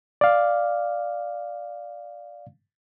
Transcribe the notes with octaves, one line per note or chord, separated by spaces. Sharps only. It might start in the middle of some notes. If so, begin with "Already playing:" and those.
D5 F5